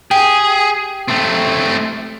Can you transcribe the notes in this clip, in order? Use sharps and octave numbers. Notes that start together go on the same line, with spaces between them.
G4 G#4
A3 C4